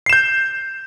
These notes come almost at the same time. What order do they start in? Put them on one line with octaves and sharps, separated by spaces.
C7 E7 G6